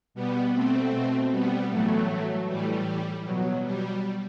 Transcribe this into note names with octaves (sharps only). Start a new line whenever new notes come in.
B2 G3 B3
A3 C4
B2
G3 B3
A2 E3 F#3 A3
A2 E3 G3
B2 F#3
G3